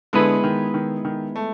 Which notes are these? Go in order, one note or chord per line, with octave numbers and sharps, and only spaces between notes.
D3 G#3 B3 E4 G#4 B4
D#3
D#3
D#3
A3